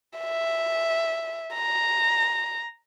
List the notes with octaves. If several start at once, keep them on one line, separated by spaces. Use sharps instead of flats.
E5
A#5